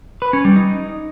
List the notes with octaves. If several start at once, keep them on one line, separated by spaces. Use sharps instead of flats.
B4
C#4
G3
D#4